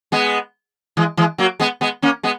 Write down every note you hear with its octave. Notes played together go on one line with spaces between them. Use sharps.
G#3 B3
E3 G#3
E3 G#3
F#3 A#3
G#3 B3
G#3 B3
A#3 C#4
G#3 B3